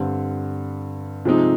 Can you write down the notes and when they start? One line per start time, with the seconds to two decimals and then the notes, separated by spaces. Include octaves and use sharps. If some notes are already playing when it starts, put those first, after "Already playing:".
Already playing: G2 D3 G3 C4
1.25 C3 F3 G#3 C4 D#4